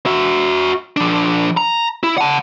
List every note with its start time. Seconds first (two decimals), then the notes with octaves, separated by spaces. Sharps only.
0.06 F#4 E5
0.97 F3 D4
1.57 A#5
2.03 E4
2.18 F#5 A5